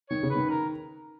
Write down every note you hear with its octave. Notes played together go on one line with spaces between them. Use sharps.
D#3 C#5
C#3
D#3 B4
A#4